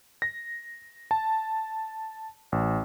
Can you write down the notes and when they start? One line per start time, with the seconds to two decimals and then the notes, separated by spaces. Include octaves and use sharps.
0.22 A#6
1.11 A5
2.52 A1